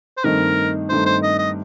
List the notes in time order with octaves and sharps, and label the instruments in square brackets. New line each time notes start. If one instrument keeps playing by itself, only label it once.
[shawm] C5
[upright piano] G2 D#3 A3 C4 D#4 [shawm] A#4
[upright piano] G2 D#3 A3 C4 D#4 [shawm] C5
[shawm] C5
D#5
D#5